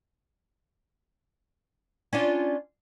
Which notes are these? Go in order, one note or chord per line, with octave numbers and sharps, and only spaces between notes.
C#4 D4 F4